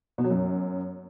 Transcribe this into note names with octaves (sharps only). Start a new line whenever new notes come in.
B2
F#3
F#2